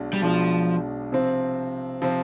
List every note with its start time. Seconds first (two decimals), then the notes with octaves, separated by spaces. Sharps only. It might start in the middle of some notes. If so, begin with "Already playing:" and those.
Already playing: B1 B2 G#3 D4
0.13 G3
0.21 B1 B2 F3 G#3 D4
1.12 C3 F3 C4
2.02 C3 F3 C4